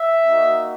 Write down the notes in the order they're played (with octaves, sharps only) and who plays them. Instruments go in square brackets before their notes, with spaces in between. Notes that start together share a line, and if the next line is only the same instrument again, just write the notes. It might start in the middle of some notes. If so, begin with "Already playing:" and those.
Already playing: [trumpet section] E5
A#3 D#4 F#4